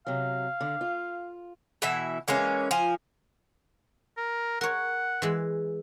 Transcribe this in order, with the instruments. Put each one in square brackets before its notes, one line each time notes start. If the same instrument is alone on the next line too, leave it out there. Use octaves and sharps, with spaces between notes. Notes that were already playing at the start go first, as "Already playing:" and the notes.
[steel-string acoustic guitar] C3 F#3 [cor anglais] F5
[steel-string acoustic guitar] D3
F4
[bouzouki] B2 E3 E4 E5
E3 G#3 A#3 C#4
F3 F4 G#5
[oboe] A#4
[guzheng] A#4 C#5 [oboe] F#5
[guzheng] E3 G#3